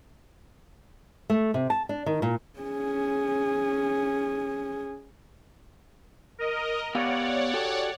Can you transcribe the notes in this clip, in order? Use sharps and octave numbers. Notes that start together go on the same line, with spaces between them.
A3
C3
A5
D4
D#3
A#2
C#4 G#4
A#4 D#5
B3 G4 C#5 D5 F5 F#5
F#4 G4 A4